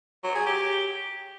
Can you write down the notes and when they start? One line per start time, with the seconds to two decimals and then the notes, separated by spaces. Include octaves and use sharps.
0.24 F#3
0.35 G#4
0.46 G4